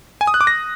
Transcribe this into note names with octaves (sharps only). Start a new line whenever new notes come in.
G#5
D#6
F#6
D6
A#6